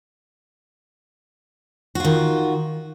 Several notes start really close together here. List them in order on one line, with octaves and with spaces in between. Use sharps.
F#4 F4 D#3